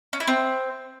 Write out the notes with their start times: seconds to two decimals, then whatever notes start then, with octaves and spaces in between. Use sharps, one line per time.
0.13 C#4
0.20 E4
0.27 C4